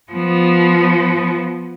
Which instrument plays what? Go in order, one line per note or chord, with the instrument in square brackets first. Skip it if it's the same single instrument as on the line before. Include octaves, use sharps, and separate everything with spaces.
[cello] F3 B3